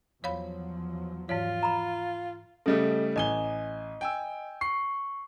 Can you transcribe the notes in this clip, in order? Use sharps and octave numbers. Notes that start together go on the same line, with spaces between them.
E2 F3 F#3 C#5 F5 B5
G#2 E3 F4 C#5
A#5 B5
C#3 G3 A3 A4 D#5
A1 D#5 G#5 G7
G5 G#5 E6
C#6 C7